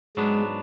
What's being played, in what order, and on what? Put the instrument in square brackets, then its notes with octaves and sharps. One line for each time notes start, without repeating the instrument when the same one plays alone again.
[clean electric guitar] G#2 F#3 B3 D4 [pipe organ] G#3